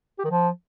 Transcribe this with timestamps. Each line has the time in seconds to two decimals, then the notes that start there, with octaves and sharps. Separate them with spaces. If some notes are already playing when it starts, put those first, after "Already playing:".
0.19 G4
0.24 D#3
0.30 F3